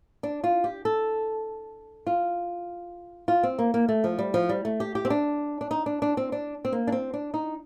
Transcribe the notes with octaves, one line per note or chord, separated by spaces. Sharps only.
D4
F4
G4
A4
F4
F4
C4
A#3
A#3
A3
F3
G3
F3
G3
A3
G4
G4
C4
D4
D4
D#4
D4
D4
C4
D4
C4
A#3
D4
C4
D4
D#4